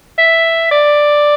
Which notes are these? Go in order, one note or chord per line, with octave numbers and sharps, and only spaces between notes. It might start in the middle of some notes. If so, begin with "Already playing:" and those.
E5
D5